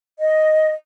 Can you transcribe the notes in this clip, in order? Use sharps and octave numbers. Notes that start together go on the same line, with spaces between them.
D#5